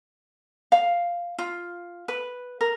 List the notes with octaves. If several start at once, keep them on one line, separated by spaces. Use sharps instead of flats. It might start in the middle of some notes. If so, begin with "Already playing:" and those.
F5
F4
B4
A#4